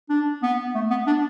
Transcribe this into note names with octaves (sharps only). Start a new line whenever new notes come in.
D4
B3
A3
B3
D4